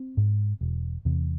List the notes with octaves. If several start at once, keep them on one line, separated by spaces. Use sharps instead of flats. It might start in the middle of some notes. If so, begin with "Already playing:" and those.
Already playing: C4
G#2
E1
E2 C3